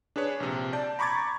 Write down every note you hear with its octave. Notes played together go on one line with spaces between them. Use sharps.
D4 G#4 B4 C#5
A#1 C3
D5 A5 G6
A#5 B5 C#6 D6 G#6 A6